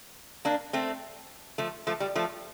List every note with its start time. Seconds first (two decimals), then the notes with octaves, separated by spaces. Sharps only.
0.45 A#3 D4
0.73 A3 C4
1.58 F3 A3
1.87 F3 A3
2.00 G3
2.15 F3 A3